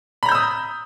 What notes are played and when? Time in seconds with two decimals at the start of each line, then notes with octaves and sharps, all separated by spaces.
0.23 B5
0.26 A#5
0.29 G6
0.32 E6
0.35 D#6